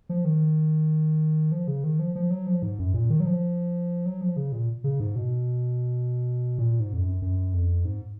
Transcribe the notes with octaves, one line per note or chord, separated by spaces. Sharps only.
F3
D#3
F3
C#3
D#3
F3
F3
F#3
F3
G#2
F#2
A#2
D#3
F#3
F3
F#3
F3
C#3
A#2
C#3
G#2
B2
A#2
G#2
F2
F#2
F#2
F2
G#2